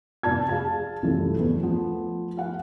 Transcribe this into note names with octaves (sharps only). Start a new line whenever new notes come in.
F1 D5 A5 G#6
G#4 F5 A5
C2 F#2 E3 F3 A3
E2
F3 A3 B3
F5 F#5